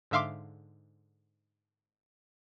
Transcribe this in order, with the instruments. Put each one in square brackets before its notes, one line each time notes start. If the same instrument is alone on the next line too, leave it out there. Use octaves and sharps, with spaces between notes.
[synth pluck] G#2 D3 E5 F5 C6 D6